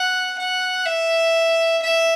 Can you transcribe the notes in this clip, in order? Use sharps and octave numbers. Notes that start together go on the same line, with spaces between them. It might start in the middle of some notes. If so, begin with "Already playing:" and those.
Already playing: F#5
F#5
E5
E5